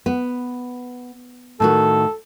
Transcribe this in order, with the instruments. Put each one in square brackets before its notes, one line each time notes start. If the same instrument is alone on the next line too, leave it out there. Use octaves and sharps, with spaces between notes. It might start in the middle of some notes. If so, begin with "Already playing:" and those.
[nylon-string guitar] B3
[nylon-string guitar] A2 D#3 F#4 [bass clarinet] A4